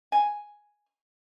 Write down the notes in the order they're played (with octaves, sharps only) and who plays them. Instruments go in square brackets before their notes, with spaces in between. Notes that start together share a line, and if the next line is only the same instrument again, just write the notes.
[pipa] G#5